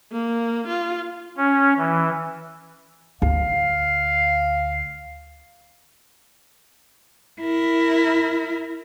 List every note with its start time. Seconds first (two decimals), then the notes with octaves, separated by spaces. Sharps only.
0.12 A#3
0.68 F4
1.37 C#4
1.78 E3
3.22 D2 F5
7.41 E4 A#4